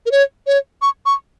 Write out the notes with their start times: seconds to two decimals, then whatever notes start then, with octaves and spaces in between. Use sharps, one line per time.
0.06 A#4
0.11 C#5
0.47 C#5
0.82 C#6
1.06 C#6